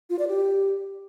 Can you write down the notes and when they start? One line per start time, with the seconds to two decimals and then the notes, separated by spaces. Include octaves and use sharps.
0.10 F4
0.19 D5
0.28 G4